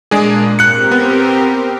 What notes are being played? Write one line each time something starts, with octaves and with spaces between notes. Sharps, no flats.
A#2 G#3 A#3 D4 G#4
C4 G4 A#4 F#6 C#7
B3